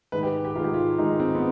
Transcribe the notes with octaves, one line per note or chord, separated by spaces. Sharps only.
G#2 D#3 G#3 B4
G4
G4
G#2 D#3 G#3 F4
G4
F4
G#2 D#3 G#3 D#4
C4
B3